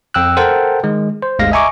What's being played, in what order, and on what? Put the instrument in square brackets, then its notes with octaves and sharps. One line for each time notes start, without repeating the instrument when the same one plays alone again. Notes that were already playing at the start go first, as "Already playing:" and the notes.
[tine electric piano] F2 G5 E6 F#6
A4 A#4 C5 F#5 G5 A5
D#3 G#3
C5
G1 D2 G#3 F5 A#6
D#5 E5 G#5 A#5 C#6 D6